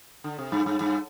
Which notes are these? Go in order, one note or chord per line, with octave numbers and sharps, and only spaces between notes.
D3
C3
G2
G2
G2